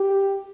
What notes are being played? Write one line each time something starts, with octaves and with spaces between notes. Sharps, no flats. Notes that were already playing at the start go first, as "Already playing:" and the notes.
Already playing: G4